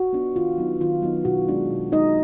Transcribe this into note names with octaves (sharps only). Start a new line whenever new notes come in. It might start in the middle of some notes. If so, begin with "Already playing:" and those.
Already playing: F#4
B3 D4 F4
D#3 F4
F#3 B3 D#4
D#3 F4
F#3 B3 D#4
B2 F#4
G#3 D4
B2
G#3 D4 D#4 D#5